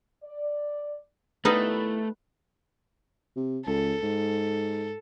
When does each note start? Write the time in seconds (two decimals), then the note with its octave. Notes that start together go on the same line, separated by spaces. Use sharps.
0.23 D5
1.45 D#2 G3 A3 B3 D#4 E4 B4
3.37 C3
3.67 C#2 A4
4.02 G#2